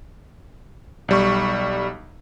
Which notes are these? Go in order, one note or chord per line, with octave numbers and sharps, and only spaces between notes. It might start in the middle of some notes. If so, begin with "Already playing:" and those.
B1 G3 C#6